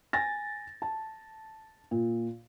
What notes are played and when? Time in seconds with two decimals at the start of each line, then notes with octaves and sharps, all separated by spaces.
0.13 G#5 A6 A#6
0.82 A5
1.91 A#2